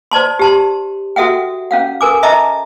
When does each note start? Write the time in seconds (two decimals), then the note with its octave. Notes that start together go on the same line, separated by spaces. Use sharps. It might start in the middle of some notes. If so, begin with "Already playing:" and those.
0.11 C5 D5 A5 C6
0.39 G4 A5 C6
1.16 F#4 A4 E5 F#5 G5
1.71 C#4 F5 F#5
2.01 A4 A#4 G#5 D6
2.23 D#5 E5 A5 A#5 D6